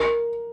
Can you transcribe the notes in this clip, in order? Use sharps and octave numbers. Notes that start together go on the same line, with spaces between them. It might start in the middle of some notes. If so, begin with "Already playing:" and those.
Already playing: A#4